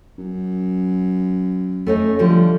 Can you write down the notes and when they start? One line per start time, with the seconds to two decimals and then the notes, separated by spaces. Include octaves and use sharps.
0.18 F#2
1.87 A3 C#4 D#4
2.19 D3 F3 G3